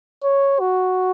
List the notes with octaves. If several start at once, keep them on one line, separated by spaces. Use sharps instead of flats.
C#5
F#4